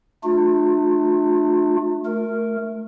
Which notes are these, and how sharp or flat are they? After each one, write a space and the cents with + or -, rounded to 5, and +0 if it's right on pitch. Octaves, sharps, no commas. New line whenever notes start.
A3 -15 D4 +35 F4 +40
A3 +0 A#4 +0